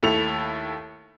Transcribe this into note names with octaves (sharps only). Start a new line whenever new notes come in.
D#2 A3 E4 A4 F7